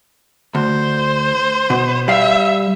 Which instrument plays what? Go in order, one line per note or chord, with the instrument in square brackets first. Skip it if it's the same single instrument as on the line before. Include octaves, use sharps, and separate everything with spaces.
[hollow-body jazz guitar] D2 [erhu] C5
[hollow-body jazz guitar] B2
[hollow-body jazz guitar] G3 F5 [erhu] E5